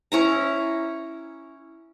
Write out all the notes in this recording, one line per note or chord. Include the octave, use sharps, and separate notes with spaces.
C#4 E4 A#5